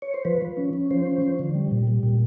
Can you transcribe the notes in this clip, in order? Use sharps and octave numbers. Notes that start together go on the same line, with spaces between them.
C#5
C5
F3 B4
F3
C#4
C#4
F3 C5
C#4
F3
D3
G3
A#2
G3
A#2